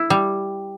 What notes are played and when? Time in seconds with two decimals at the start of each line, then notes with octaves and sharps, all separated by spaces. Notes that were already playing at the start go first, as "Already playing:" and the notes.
Already playing: E4
0.10 G3